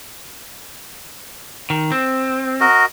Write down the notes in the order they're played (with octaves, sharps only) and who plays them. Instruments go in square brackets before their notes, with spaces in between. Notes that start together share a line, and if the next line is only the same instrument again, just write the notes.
[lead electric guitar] D#3
C4
[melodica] F#4 A#4 D#5